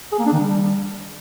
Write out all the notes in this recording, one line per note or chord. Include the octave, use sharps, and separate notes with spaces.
G#4
A#3
D4
D#3
G3